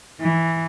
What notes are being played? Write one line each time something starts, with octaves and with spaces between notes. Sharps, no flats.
E3